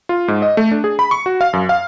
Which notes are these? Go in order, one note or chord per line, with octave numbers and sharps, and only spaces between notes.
F4
G#2
D#5
A3
D4
G#4
B5
C#6
F#4
F5
F#2
F5